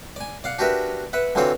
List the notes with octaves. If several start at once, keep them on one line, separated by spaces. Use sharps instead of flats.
D5 G#5
D5 F5 F#5
D4 F#4 G4 A#4 B4 E5
B4 E5 F#5
D3 E3 F#3 C4 F4 A4